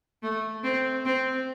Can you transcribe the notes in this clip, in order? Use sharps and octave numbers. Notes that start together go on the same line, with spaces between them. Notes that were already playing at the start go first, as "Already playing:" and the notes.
A3
C4
C4